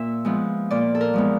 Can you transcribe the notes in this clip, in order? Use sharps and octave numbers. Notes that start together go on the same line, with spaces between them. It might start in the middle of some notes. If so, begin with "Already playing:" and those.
Already playing: A#2 E5
F3 G#3 B3
A#2 D5
A4
A#4
F3 G#3 B3